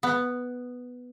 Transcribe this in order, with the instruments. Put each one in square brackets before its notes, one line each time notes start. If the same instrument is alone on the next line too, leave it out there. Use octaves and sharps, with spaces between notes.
[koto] B3